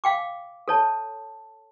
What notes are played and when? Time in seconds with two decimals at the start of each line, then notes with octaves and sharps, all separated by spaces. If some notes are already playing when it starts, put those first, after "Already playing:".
0.04 F5 G5 D6
0.68 A4 C#5 A5